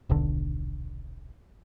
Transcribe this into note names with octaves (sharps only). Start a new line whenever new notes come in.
D#1 B1 D3